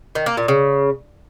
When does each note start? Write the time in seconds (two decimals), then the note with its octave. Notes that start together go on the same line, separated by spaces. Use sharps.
0.15 D#3
0.26 A#3
0.37 A#2
0.48 C#3